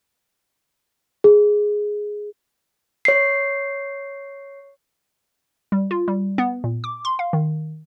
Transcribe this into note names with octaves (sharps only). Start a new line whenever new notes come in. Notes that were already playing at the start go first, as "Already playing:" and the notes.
G#4
C#5 C7
G3
F4
G3
B3
A#2
D6
C6
F5
D#3